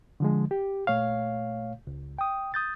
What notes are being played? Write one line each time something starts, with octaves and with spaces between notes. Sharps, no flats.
D3 F3 G#3
G4
A#2 A3 C#5 F5
C#2
G5 D#6
D#6 G6 A6